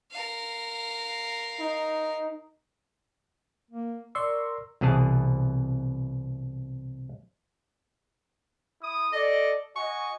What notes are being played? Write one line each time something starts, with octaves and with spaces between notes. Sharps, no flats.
A#4 F5
D#4
A#3
A#4 D5 C6 C#6 E6
C2 B2 E3 G#4 A5
E4 D#6
A4 D5 D#5
F#4 D#5 G#5 C#6